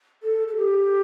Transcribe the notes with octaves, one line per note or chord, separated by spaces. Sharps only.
A4
A4
G4